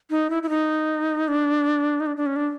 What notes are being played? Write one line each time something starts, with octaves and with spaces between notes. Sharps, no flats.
D#4
E4
E4
D#4
D4
D#4
D4
D4
C#4
D4